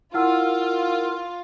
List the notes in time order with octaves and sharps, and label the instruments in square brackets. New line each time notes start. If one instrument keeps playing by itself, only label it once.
[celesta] E4 F#5 E6 [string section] F4 [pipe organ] A#4